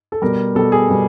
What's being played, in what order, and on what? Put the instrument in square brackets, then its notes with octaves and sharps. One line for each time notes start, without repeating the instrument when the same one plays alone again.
[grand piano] A4
B2 G3 A#4
B2 G3 A4
G#4
B2 G3